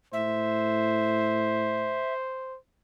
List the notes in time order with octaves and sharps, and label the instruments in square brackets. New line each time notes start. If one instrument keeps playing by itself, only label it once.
[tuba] A2 [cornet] C5 [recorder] E5